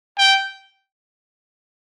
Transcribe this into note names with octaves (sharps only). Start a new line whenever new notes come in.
G5